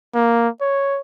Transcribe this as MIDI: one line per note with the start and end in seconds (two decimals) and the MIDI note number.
0.14 0.48 58
0.61 1.00 73